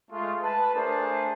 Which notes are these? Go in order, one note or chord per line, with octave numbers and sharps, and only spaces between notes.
G#3 A3 F4
B4 A5
A3 D4 G#4 A#4 C5 A5